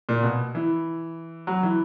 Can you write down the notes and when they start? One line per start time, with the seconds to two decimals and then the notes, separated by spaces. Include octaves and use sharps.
0.09 A#2
0.23 B2
0.55 E3
1.47 F#3
1.63 E3